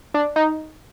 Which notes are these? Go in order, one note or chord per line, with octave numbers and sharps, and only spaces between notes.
D4
D#4